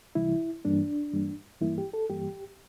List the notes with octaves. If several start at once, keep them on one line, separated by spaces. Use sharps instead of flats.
C2 C3 E3 G3 E4
G2 E3 G3 A#3 D4
G2 E3 G3 A#3
G2 E3 G3 A#3 E4
G4
A4
G2 E3 G3 A#3 G4